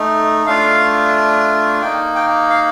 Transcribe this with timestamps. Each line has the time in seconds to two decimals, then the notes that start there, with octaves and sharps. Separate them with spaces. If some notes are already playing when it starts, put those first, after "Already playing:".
Already playing: A3 D#4
0.47 A3 D4 F4 F5
1.82 A#3 D#4 G5
2.15 G5
2.50 F5